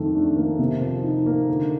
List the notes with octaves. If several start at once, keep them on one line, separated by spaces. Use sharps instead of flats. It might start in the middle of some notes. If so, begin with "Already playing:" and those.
Already playing: F2 D#3 A3
D4
A#3
C3
F3
D#4
A#3
D3